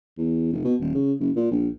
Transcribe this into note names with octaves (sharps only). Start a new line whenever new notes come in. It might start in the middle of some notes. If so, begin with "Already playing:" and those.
E2
F1
B2
D#1
C#3
F#1
A#2
A#1